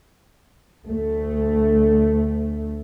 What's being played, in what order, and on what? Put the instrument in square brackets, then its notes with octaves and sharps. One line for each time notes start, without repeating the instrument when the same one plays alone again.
[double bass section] D2 A3